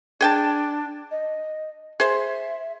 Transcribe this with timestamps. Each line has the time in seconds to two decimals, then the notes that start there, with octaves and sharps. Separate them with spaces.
0.21 D4 G#4 G5 A5
1.11 D#5
2.00 G#4 C5 E5